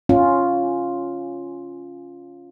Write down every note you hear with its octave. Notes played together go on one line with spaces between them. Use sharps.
C#4 F4